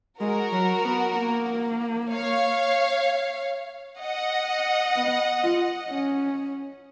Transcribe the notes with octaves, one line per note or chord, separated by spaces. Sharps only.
G#3 F#4 A#4
F#3
B3
A#3
C#5 F5
D#5 F#5
B3
F4
C#4